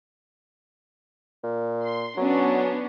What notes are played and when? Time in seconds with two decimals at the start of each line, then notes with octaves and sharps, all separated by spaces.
1.44 A#2
1.83 C6
2.17 F#3 B3 C#4 D4